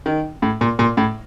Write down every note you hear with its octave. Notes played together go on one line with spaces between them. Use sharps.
D#3
A2
A#2
A#2
A2